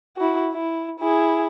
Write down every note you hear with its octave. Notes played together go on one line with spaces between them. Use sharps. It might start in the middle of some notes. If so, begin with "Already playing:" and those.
E4 F#4
E4
E4 G#4